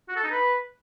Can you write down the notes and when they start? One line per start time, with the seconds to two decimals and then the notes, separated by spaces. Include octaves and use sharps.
0.09 F#4
0.16 A4
0.24 D#4
0.31 B4